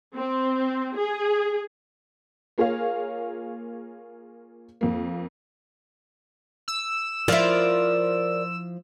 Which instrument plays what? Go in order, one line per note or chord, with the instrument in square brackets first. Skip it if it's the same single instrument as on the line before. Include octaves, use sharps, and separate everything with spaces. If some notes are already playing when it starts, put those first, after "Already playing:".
[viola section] C4
G#4
[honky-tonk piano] A#3 F4 G#4 A#4 C#5 F5
F2 A#3
[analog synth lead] E6
[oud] F3 E4 [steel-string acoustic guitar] A#4 D5